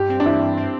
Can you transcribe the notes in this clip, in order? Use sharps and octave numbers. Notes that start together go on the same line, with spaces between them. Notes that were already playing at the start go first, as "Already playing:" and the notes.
Already playing: G2 G4
C4
D4
E3 E4
G2
C4